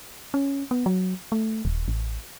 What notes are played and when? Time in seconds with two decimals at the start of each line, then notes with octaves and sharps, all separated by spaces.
0.34 C#4
0.71 B3
0.86 F#3
1.32 A3
1.65 D#1
1.88 A1